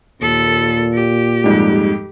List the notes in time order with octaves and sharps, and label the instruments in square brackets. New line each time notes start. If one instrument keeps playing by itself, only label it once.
[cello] D#2 A4 [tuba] A#2
[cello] G4
[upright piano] F2 G#2 G3